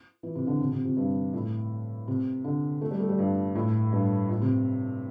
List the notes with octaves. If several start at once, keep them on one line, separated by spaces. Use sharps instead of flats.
E3
C3
D3
C3
C3
C3
G2
A2
C3
D3
A3
G3
A3
G3
G2
A2
G2
A2
C3